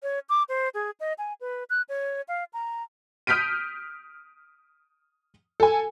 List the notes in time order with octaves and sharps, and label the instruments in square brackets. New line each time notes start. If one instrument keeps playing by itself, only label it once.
[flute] C#5
D6
C5
G#4
D#5
G#5
B4
F#6
C#5
F5
A#5
[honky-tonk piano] D#6 F6 G6 B6 D7 D#7
A4 G#5